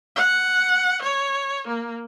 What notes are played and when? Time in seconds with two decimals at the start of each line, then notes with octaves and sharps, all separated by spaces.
0.16 F#5
1.02 C#5
1.67 A#3